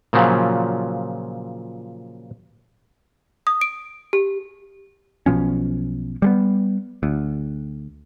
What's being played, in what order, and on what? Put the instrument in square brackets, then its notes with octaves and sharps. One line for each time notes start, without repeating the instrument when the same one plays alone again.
[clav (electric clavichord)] A#2 C#3 F3 F#3
[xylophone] D#6
D7
G4
[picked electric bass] B1 B2 F3 C#4
G3 G#3 B3
D2